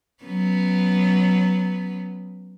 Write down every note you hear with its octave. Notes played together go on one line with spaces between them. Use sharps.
F#3 B3 C#4